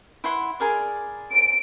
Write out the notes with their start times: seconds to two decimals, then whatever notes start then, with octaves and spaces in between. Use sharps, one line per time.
0.24 E4 F#5 C6
0.60 G#4 A#4 D5
1.32 D7